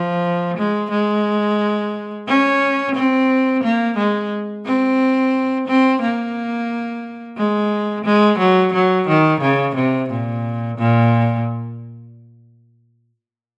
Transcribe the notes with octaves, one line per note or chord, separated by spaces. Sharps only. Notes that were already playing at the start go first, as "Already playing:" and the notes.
Already playing: F3
G#3
G#3
C#4
C4
A#3
G#3
C4
C4
A#3
G#3
G#3
F#3
F#3
D#3
C#3
C3
A#2
A#2